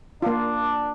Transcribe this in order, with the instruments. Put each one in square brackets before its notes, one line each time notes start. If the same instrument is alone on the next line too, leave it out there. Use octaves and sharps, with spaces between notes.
[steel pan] A#3 F4 [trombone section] D4